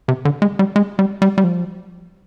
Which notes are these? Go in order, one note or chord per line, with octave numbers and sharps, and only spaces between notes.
C3
D3
G#3
G3
G#3
G3
G3
G3
F3